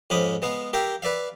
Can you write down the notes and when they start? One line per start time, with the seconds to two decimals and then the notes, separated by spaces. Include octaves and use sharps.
0.10 F2 G#2 C#4 B5 D6 D#6
0.42 G#3 B3 F5
0.73 G4 A#4 E5 F5 G5
1.02 B4 D5 E5 F5